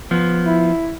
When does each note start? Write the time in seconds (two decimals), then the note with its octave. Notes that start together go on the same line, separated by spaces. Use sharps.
0.11 F3 B3
0.45 E4